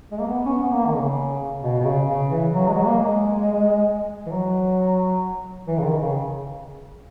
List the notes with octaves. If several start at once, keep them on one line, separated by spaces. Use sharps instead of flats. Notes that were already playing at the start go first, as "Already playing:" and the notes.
G#3
A#3
B3
C#4
B3
B3
A#3
D#3
C#3
B2
B2
C#3
C#3
E3
F#3
G#3
F#3
A#3
G#3
E3
F#3
E3
C#3
D#3
C#3